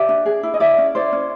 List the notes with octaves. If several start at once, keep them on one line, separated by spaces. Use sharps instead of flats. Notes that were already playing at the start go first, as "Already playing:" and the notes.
Already playing: G4 D5 E5
D4
G#4
E4
D#5
E4 D5 E5
C#4
E4 C5 D5
C#4